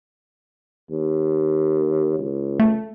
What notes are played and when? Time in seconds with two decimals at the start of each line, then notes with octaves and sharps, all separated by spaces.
0.90 D#2
2.19 C#2
2.60 A3